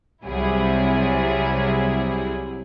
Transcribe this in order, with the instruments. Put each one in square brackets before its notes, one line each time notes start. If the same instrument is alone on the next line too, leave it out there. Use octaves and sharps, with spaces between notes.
[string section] C2 C3 F#3 G3 E4 G#4